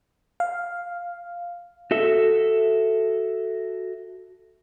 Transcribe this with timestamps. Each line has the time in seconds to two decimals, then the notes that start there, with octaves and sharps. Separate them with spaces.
0.40 F5
1.91 F#4 A4 E5